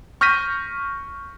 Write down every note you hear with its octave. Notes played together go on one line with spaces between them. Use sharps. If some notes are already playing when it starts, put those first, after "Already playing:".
C#6 F6 G6 A#6 B6 D#7